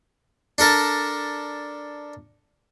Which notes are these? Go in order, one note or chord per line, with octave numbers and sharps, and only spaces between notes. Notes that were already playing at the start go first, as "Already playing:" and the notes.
D4 A4 A#4 D5